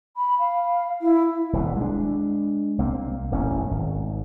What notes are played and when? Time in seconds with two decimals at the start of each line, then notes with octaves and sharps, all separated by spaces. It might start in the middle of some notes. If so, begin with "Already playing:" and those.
0.16 B5
0.39 F5
1.01 E4
1.53 D#1 C2 B2
1.77 G#3 D4
2.78 C2 A#3 C4
3.31 E1 A1 F#2 C#4
3.71 G#1